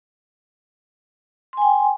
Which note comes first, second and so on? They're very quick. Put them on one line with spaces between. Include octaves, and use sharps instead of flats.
C6 G#5 G5